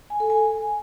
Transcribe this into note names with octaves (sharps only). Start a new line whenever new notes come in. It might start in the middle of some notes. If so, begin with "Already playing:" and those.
G#5
A4
G#5